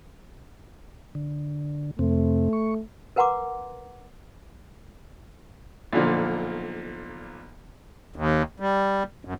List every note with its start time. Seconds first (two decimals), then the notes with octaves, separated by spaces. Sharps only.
1.15 D3
1.99 F2 C3 A3 C4
2.53 C#6
3.16 A#4 B4 F#5 A#5 C6 D6
5.93 B1 A#2 D3 F3
8.16 D#2
8.60 G3
9.25 F#2